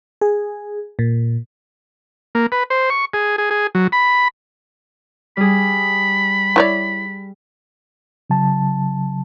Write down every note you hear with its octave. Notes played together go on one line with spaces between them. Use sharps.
G#4
A#2
A#3
B4
C5
C#6
G#4
G#4
G#4
F#3
B5
G3 G#4 B5
E4 C#5 D5
C#3 F#3 A5